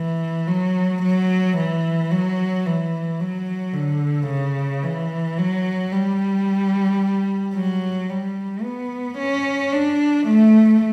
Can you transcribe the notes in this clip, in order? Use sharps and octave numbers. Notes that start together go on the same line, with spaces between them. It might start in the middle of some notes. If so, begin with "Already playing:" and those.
Already playing: E3
F#3
F#3
E3
F#3
E3
F#3
D3
C#3
E3
F#3
G3
F#3
G3
B3
C#4
D4
A3